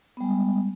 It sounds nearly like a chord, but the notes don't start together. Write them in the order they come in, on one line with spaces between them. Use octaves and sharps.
B3 G3 G#3